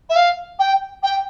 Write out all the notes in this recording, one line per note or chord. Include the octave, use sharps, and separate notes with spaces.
E5
F5
G5
G5